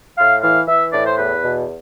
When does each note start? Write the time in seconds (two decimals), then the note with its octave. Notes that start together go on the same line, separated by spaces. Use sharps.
0.17 A2 F5
0.42 E3 F5
0.67 E3 E5
0.92 A2 D5
1.06 C5
1.17 E2 B4
1.43 B2